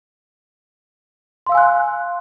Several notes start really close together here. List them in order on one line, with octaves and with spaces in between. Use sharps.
C6 F5 E6 G#5 F#6